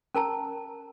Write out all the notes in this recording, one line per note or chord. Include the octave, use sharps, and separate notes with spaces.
C#4 A#4 A5 A#5